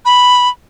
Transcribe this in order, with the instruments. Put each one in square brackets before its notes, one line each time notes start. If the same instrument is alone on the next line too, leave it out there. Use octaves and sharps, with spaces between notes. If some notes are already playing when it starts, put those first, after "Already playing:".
[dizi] B5